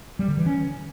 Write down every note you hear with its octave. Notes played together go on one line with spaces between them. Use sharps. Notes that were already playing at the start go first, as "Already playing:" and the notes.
G3
D3
E3
C#4